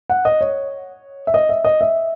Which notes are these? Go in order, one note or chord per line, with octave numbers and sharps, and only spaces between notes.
F#5
D#5
C#5
E5
D#5
E5
D#5
E5